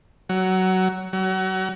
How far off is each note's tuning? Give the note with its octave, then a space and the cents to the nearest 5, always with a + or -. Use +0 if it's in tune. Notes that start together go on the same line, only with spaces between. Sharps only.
F#3 +15
F#3 +30